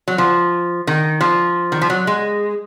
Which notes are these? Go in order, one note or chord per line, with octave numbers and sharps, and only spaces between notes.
F#3
F3
D#3
F3
D#3
F3
F#3
G#3